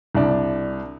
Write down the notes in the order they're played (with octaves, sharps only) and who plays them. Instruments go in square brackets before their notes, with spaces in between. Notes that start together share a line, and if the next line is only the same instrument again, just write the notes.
[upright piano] C2 D4